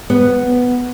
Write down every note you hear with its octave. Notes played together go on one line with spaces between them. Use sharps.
B3